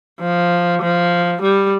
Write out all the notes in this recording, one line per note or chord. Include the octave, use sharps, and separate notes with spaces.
F3
F3
G3